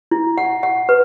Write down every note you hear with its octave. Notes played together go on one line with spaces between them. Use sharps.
E4
F#5
F#5
B4